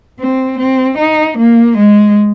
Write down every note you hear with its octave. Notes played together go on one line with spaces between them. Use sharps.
C4
C4
D#4
A#3
G#3